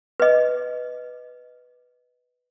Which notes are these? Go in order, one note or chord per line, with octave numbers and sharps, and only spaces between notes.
B4 D#5